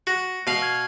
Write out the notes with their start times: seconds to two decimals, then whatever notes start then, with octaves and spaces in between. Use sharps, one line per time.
0.07 F#4 A#6
0.47 B2 F5
0.62 F6 G#6